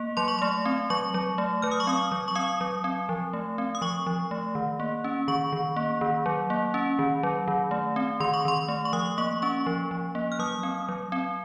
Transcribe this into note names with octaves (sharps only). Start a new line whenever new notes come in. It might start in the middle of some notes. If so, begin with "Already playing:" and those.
Already playing: A#3
F#3 C6
C#6
A3 C6
C4
F#3 C#6
F#3
A3
F#3 F6
D#6
C#6
C4 D#6
F#3
C#6
C4 D#6
F#3
C4
F3
A3
C4
D#6
F3 C#6
F3
A3
D#3
A#3
C#4
D#3 C#6
D#3
A#3
D#3
F#3
A#3
C#4
D#3
F#3
D#3
A3
C4
D#3 C6
C#6
D#3 C6
A3
C#6
F3 D#6
A#3 C#6
C#4 C#6
F3
F3
A#3
F6
F#3 D#6
C4
F#3
C4